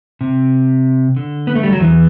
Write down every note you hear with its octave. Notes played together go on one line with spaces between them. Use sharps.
C3
D3
B3
A3
G3
F#3
E2 E3